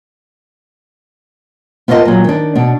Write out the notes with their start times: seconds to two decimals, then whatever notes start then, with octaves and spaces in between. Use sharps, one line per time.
1.88 B3 F4 A#4 C#5 D#5 A5
2.06 A#2 F#3
2.24 D#3 D4
2.55 B2 D4